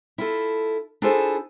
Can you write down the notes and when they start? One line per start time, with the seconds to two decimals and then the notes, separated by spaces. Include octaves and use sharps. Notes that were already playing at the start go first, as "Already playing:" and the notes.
0.18 E4 F4 A4
1.02 D4 E4 F4 G#4 A4 C5